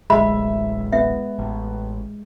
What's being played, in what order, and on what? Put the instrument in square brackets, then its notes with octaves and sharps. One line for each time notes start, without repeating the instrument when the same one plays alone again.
[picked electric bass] D1 A1 [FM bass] G#3 [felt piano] E5 [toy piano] B5
[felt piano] B3 [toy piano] E5
[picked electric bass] A1